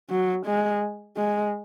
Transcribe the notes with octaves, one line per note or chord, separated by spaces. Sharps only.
F#3
G#3
G#3